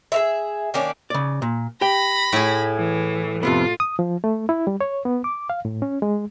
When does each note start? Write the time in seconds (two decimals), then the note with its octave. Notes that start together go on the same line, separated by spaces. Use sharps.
0.12 G#4 A#4 E5
0.74 D#3 A#3 C#4 D4
1.10 C#3 D5
1.42 A#2
1.81 G4 G5 B5 A#6
2.33 A2 G#4
2.78 E3
3.43 F2 C3 B3 F4
3.80 D#6
3.99 F3
4.24 A3
4.49 E4
4.67 G3
4.81 C#5
5.05 B3
5.24 D6
5.50 F5
5.65 A2
5.82 C#4
6.02 G#3